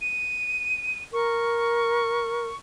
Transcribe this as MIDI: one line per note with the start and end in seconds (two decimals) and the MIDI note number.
0.01 1.02 99
1.13 2.48 70
1.13 2.56 85